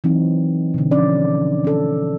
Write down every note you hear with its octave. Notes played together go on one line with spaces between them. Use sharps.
E3 F#3 C4 D#4
B2 D3
F3 C#4 D4 D5
C#4 A4